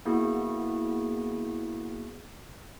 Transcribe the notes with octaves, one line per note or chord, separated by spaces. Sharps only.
A#3 B3 E4 F#4 G#4